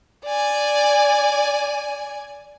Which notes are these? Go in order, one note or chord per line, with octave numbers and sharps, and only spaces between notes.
D5 G#5